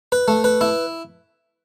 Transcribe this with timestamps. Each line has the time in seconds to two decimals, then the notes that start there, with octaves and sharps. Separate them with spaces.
0.12 B4
0.28 A3
0.44 B4
0.61 E4